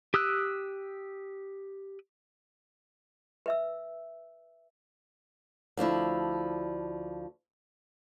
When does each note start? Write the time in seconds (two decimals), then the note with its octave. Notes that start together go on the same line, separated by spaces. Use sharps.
0.14 G4 D#6 E6 F#6
3.46 B4 E5 E6
5.77 D2 F3 D4 E4